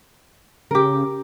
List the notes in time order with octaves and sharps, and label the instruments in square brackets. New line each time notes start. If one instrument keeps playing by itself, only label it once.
[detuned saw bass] C#3 [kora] G4 A#4